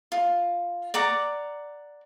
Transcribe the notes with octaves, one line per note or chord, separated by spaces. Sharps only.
F4
D5 F#5 A#5 D6